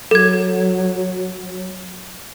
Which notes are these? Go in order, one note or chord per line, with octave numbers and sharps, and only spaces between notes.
F#3 A4 G#6